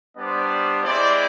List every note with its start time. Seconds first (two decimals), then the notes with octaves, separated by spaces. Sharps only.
0.16 G3 B3 D4 C5 D5
0.84 G#3 C4 E4 C5 D5